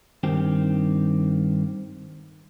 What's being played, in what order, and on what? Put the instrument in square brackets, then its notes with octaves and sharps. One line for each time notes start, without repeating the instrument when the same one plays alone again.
[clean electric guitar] G2 D#3 C4 G4